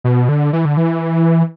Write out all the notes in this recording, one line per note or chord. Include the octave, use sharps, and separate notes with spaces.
B2
D3
E3
D3
E3